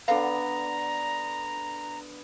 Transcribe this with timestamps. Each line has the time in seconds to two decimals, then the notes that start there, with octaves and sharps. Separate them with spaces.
0.08 D3 B3 D4 A4 F5 A#5